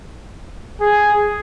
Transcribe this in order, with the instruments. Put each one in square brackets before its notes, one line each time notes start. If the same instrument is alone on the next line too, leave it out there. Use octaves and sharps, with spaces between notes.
[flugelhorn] G#4